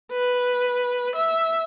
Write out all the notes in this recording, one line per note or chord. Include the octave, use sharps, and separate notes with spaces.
B4
E5